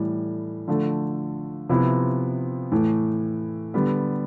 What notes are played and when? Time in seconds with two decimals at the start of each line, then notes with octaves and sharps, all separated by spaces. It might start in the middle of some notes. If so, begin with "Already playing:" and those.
Already playing: A2 E3 G3
0.68 D3 F3 A3
1.69 C3 F3 B3 E4
2.72 A2 E3 A3
3.74 D3 G3 B3